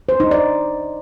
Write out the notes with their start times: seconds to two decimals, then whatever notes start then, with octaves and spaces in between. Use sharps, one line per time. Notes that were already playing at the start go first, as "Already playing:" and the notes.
0.09 C5
0.20 D#4
0.31 D5